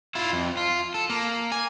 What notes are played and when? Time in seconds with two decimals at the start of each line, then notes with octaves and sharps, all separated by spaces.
0.15 E4 F4
0.33 F2
0.57 F4
0.94 A4
1.10 A#3
1.52 G#5